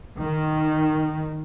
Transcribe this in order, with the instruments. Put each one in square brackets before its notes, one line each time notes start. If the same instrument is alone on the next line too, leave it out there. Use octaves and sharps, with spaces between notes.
[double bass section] D#3